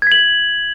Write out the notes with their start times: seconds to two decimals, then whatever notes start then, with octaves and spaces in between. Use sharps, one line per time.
0.02 G#6
0.07 B6
0.12 F#7